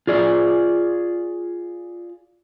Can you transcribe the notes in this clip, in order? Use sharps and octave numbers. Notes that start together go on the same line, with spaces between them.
F4 G#4 D5